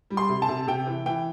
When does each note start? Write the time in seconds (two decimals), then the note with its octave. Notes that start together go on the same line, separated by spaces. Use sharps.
0.11 G3
0.17 C6
0.29 C3
0.42 A5
0.49 C3
0.67 C3 G5
0.86 E3
1.06 E3 G5